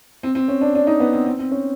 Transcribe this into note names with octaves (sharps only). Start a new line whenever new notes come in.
C4
C4
C#4
D4
D4
D#4
B3
C4
C4
C4
C#4